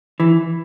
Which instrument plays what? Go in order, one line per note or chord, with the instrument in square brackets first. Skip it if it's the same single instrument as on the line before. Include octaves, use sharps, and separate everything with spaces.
[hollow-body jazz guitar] E3